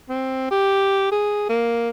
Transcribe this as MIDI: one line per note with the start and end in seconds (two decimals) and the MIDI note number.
0.09 0.46 60
0.51 1.09 67
1.12 1.47 68
1.49 1.90 58